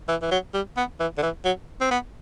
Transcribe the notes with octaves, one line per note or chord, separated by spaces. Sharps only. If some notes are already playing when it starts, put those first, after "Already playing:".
E3
E3
F#3
G3
B3
E3
D3
E3
F#3
C4
B3